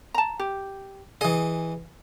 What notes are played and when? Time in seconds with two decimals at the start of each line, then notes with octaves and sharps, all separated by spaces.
0.14 A5 A#5
0.39 G4
1.21 E3 G#4 D#5